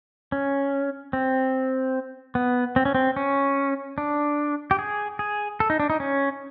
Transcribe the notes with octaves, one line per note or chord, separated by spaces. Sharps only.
C#4
C4
B3
C4
C#4
C4
C#4
D4
G4
G#4
G#4
A4
D#4
D4
D#4
C#4